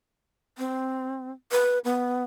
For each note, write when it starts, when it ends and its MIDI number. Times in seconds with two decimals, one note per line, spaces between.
0.58 1.31 60
1.52 1.79 71
1.85 2.24 59